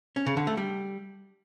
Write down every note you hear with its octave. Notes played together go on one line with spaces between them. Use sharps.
C#4
C#3
D3
A3
G3